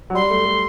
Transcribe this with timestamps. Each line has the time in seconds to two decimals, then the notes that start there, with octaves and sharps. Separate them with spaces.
0.10 F#3
0.15 G3 C6
0.30 A3
0.45 A3